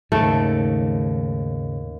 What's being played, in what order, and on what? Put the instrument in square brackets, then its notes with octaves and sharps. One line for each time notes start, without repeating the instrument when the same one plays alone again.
[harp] D#2 [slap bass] G#2 C#3 [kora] A3